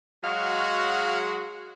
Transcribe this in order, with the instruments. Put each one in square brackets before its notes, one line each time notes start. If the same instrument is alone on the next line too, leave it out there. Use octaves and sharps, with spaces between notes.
[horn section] F#3 G#3 F#4 [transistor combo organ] F5